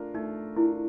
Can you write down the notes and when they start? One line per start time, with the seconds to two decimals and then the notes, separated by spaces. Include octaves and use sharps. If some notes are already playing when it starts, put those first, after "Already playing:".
Already playing: A3 D4 F4 A#4
0.14 A3 D#4
0.56 D4 E4 F4 A#4